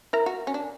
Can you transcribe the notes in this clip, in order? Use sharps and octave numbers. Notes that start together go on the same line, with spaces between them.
E4 A#4 A#5
F#4
C#4
D4